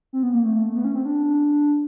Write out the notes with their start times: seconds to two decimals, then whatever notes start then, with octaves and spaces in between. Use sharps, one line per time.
0.13 C4
0.23 B3
0.33 A#3
0.44 A3
0.75 B3
0.84 C#4
0.95 C4
1.05 D4